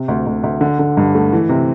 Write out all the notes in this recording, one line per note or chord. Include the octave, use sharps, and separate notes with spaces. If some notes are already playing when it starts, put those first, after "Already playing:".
Already playing: C3
D2
D2
D2
D3
D3
G2
A3
E3
C3